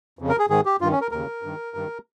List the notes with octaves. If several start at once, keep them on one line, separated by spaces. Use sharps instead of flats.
F2 C#3
A#4
G#4
G#2 D#3 G#4
G4
G2 D#3 F4
C#4
A#4
D#2 C#3 A#4
G2 D#3
G2 D#3